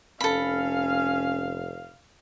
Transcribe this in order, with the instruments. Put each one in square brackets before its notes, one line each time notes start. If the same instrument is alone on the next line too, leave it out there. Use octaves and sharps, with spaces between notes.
[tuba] F1 [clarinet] C#4 [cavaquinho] A4 B5 [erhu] F5